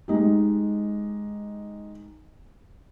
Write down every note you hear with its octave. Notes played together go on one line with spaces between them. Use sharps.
G#3 D#4 G4